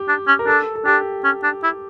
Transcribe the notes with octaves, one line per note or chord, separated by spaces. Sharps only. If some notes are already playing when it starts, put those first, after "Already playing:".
Already playing: G4
D4
C#4
A#4
D4 A4
A4
D4 G4
C#4
D4
E4